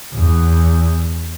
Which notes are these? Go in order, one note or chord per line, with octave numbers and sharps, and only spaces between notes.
E2